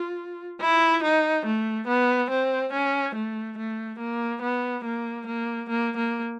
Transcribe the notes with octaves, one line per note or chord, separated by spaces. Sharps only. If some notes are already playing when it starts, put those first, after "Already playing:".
Already playing: F4
E4
D#4
A3
B3
C4
C#4
A3
A3
A#3
B3
A#3
A#3
A#3
A#3